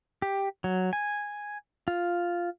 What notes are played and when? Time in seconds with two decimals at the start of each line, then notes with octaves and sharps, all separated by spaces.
0.22 G4
0.64 F#3
0.93 G#5
1.88 F4